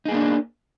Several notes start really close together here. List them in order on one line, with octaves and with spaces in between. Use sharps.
D#4 G#4 A#3 D4